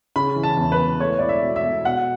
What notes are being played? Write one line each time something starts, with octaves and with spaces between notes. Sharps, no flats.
C#3 B5
E3
A5
E2
B4
B3
A3 C#5
E4 D5
E5
B2
E5
B2
B2 F#5